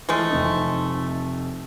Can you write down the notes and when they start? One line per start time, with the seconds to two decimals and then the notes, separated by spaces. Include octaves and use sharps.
0.09 E3 F3 G#3 A3
0.30 F1 C4 D#4